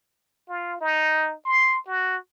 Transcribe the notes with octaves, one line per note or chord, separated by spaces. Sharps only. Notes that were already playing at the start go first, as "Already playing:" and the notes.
F4
D#4
C6
F#4